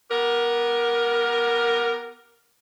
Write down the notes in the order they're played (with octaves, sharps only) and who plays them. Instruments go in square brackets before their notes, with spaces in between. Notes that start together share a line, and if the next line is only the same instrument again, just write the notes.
[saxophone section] B3 G4 A#4